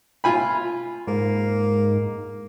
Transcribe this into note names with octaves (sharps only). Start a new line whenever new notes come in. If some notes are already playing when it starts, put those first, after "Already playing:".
F4 G#5 B5
G#2 A#3